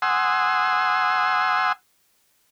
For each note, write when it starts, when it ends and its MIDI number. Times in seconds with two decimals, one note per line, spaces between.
0.02 1.72 78
0.02 1.72 80
0.02 1.72 84
0.02 1.72 87
0.02 1.72 88